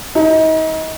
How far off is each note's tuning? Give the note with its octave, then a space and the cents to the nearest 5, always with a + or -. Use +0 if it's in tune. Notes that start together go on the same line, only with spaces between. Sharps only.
D#4 +35